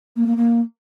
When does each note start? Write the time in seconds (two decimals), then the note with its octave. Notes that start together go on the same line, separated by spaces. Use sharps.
0.16 A#3
0.27 A#3
0.37 A#3